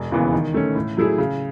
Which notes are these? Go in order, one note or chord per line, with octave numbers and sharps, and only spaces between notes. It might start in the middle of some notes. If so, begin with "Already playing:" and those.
Already playing: E1
D#2 C#3 E3 B3
D#3
A3 C#4
A2
F#3 A3 E4 G#4
C#3